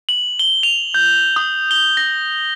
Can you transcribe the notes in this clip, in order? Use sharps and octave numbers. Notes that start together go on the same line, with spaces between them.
F#7
G7
F7
G6
D#6
G7
A#6